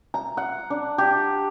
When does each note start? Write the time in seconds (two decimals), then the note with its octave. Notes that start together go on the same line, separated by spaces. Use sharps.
0.14 A#5
0.37 F#5
0.70 D4
0.98 G4